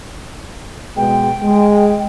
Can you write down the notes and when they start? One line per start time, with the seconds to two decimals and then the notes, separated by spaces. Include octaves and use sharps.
0.97 B2 G#3 G5
1.43 G#3